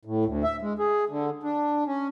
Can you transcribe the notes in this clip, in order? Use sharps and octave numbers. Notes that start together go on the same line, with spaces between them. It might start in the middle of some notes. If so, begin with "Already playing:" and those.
A2
D2
E5
G#3
G#4
D3
D4
C#4